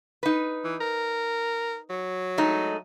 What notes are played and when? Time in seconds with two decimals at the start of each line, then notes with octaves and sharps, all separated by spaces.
0.23 D#4 B4
0.64 E3
0.81 A#4
1.90 F#3
2.38 G#3 A3 D#4